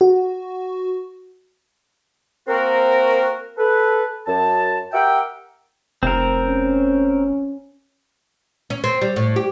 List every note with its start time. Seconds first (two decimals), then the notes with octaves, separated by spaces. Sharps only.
0.01 F#4
2.48 A#3 C4 F#4 A#4
3.58 A4 B4
4.26 F#2 A5
4.93 G4 A#4 E5 F#5 G5
6.03 F1 C4 A#4
6.47 C#4
8.70 C#4
8.84 C4
9.01 G3
9.16 A2
9.36 G4